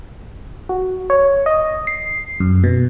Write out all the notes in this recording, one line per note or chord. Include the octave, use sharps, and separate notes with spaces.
F#4
C#5
D#5
C7
F#2
B2